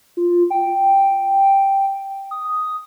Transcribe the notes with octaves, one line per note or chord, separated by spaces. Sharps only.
F4
G5
D#6